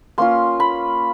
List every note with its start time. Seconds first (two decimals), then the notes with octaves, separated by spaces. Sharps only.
0.18 A#3 C#4 F4 C6
0.60 B5